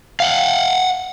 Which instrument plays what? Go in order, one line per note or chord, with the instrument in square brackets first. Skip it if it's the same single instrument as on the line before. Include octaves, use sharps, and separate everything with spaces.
[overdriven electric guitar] F5 F#5